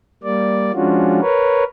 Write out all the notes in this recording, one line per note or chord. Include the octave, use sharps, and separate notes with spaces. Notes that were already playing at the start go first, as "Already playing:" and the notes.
G3 A#3 D5
F3 G#3 C#4 D4 F4 F#4
A#4 B4 C#5